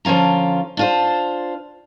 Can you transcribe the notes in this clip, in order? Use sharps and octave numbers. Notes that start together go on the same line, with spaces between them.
D3 F3 C#4 F4 A#5
D4 F4 C5